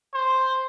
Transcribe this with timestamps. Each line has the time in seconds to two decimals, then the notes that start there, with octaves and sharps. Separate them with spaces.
0.14 C5